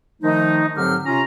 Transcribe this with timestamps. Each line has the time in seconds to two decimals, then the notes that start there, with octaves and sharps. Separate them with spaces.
0.22 D#3 F3 A3 D#4
0.76 G#2 D3 F#3 C4 G4 F6
1.06 C3 C#4 F4 A#5